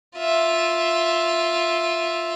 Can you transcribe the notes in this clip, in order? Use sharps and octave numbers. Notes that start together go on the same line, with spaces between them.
F4 E5